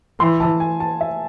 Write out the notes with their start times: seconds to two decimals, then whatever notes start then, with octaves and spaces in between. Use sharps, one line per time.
0.20 E3 C6
0.40 A5
0.60 G#5
0.80 A5
1.01 E5